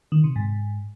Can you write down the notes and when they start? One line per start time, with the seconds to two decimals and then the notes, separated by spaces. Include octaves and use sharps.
0.12 D#3
0.24 C3
0.36 G#2